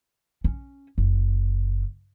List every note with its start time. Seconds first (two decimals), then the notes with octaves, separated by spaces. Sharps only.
0.44 C#4
0.98 F#1